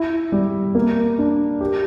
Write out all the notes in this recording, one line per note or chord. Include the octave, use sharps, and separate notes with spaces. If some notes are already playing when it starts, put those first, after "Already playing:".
Already playing: E4
G3
A#3
D4
G4